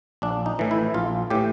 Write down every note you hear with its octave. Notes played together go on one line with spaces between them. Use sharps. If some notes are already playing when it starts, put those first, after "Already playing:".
A#1 D4
D#4
A2 E3
E4
A#1 F4
A2 E3 G4